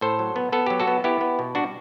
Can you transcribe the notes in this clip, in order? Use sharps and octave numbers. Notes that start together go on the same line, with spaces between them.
A2 A4 C5
F#3
B3
B3 A4
F#3 G4
F#4 A4
B3
B3 E4 G4
B3
B2
G3 D4 F#4